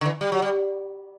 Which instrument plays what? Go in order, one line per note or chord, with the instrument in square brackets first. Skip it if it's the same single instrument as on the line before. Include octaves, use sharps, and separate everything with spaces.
[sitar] D3
E3
G3
F#3
G3